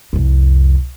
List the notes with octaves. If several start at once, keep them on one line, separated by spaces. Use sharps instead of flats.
C2 F2